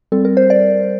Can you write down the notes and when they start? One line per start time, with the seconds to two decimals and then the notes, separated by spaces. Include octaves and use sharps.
0.12 G3 C4 A4
0.25 A#4
0.37 C5
0.50 D5